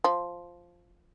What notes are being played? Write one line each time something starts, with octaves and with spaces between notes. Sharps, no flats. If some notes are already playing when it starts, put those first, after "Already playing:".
F3